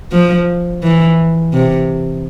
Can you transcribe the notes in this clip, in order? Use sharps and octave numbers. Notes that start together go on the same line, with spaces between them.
F3
E3
C3